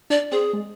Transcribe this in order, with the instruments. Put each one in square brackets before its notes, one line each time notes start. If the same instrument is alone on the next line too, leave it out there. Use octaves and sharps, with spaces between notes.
[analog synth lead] D4 [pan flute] D5
[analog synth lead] C4 [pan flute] G#4
[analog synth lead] G#3